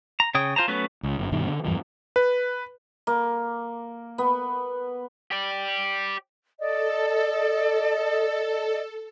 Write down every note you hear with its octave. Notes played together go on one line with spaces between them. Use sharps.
A#5
C#3 C#5 G5 D#6
F4 C5 A5 A#5
F#3 A3 B3 C#4 B4
C#2
G1 F#2
G2 B2 D#3
D3
E2 G2 E3 F3
B4
A#3
B3
G4 D5
A4 D5 D#5